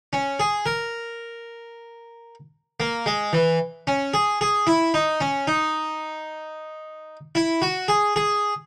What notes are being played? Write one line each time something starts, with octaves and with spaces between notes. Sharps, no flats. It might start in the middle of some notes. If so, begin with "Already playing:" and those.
C#4
G#4
A#4
A#3
G#3
E3
C#4
G#4
G#4
E4
D#4
C#4
D#4
E4
F#4
G#4
G#4